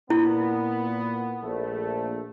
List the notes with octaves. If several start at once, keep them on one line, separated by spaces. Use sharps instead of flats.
A#2 B3 E4
A#1 A3